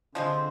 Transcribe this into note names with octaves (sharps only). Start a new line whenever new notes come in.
D3 F3 G#3 C4